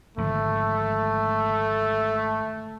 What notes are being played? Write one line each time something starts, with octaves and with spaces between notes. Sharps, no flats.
G#1 D3 F3 A3